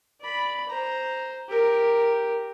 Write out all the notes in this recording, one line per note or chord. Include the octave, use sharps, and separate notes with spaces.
D5 B5
C5 A#5
G4 A#4